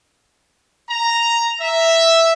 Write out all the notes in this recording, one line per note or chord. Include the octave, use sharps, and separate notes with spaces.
A#5
E5